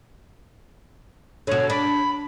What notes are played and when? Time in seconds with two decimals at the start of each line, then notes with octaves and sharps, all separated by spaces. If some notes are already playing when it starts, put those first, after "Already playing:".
1.47 B2 D3 C#5
1.70 D4 B5